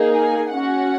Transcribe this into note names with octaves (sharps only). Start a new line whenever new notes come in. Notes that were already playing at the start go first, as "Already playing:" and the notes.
Already playing: A#3 D#4 G#4
G#5
C#4 F#4 F#5